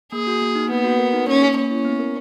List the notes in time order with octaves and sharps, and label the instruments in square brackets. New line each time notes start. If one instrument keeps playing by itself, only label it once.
[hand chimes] A#3 [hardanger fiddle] G#4
[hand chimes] F#4
A#3
D#4
[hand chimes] A#3 [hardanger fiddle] B3
[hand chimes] F#4
A#4
D#4
[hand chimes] A#3 [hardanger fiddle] C#4
[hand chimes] G#4
[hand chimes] A#3 [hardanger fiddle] C#4
[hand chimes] E4
B3
A#4